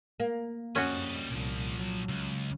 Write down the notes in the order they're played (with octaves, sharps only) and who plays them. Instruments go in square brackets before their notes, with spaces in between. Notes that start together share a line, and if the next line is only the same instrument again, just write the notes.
[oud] A#3
[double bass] F2 [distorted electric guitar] G3 D#5 [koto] C#4 F#4
[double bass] C2 [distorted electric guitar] A#2 F3
[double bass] F#3
[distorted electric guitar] C#2